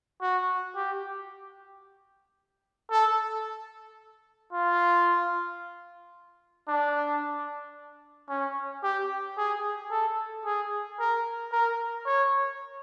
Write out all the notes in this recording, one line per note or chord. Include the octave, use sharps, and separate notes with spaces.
F#4
G4
A4
F4
D4
C#4
G4
G#4
A4
G#4
A#4
A#4
C#5